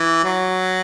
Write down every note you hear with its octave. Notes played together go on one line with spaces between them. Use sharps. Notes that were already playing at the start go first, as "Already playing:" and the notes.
Already playing: E3
F#3